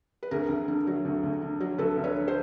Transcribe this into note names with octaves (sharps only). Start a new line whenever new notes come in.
B4
D2 G#4 A#4
D2
D3
F#3
D2
D2
D3
F#3
D2 A4 B4
D2
B4 C#5
D3
C5